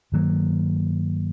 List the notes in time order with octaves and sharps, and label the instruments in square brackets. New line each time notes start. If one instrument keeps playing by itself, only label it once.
[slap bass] G2 D#3 F#3 A#3